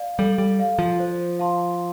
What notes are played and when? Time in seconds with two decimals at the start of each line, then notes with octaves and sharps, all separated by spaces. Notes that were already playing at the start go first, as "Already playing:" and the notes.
Already playing: D5 F5
0.19 G3 A4
0.38 G3
0.59 D5 F5
0.79 F3
0.99 C5
1.39 F5 A5 C6